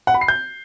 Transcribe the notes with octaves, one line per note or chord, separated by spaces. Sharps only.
F#5
B5
C7
G6